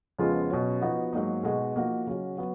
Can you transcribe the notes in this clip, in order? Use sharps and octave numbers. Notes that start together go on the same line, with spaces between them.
F2 C#3 G#3 B3 F4
B2 F#3 C#4
F3 B3 D#4 F#4
G#2 F#3 A#3 D#4
B2 G#3 D#4 F#4
F3 A#3 D#4 F#4
C#3 F#3 C#4 F#4
F#3 B3 F#4